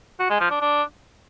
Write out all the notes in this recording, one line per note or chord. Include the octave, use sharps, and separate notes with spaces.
F#4
G#3
F3
D4
D4